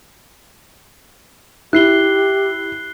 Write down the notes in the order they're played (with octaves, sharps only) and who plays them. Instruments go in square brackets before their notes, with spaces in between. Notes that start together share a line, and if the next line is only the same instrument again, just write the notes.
[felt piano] E4 [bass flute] G4 [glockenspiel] F#6 C7 G7